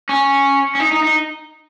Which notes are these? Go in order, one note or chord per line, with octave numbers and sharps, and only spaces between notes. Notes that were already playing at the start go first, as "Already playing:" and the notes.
C#4
C#4
D#4
D#4
D#4